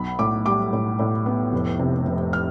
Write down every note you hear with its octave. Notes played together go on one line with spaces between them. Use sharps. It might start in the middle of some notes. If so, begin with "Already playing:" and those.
Already playing: B1 B5
A2 D6
G3 D6
A2
A2
B3
F1
C3
F1
F6